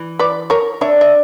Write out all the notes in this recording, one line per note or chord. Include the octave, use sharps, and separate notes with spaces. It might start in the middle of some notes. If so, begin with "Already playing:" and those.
Already playing: E3
B4 D5
A#4 C#5
D4 C#5 E5
E5